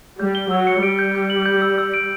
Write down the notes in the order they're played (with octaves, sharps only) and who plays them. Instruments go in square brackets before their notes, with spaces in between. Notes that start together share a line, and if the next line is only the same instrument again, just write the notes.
[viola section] G3 [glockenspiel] G6
[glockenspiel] G7
[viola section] F#3 [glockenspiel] E6
[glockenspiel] C#7
[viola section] G3 [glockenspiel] D7
[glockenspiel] G6
G6
F#7
G6
E6
E6
D7